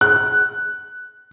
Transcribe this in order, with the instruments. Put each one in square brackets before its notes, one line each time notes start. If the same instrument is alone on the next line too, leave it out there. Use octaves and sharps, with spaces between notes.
[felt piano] F#6